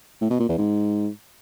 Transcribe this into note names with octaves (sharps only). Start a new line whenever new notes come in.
A2
B2
A#2
E2
G#2